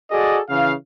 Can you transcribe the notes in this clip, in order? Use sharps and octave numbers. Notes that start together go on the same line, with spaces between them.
F#4 G#4 A4 D5 D#5
C#3 E3 F5